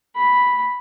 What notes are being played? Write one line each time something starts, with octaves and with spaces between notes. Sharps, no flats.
B5